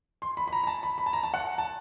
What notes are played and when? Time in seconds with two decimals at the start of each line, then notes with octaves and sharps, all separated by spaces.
0.22 C6
0.37 B5
0.48 B5
0.53 A#5
0.64 A#5
0.67 A5
0.83 B5
0.98 B5
1.06 A5
1.13 A#5
1.23 A5
1.34 F#5
1.58 A5